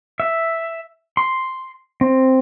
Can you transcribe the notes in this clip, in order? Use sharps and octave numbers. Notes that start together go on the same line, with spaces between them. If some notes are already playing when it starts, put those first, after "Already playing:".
E5
C6
C4